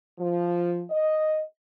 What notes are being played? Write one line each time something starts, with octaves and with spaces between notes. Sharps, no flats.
F3
D#5